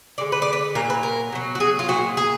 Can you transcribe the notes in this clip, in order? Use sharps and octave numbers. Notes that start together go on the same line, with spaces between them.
D3 G#3 D5
B4
D5
B4
A#2 F#3 A#4
B4
A#4
B2 F#3
F#4
G#4
F4
A#2 G#3 F#4
G#4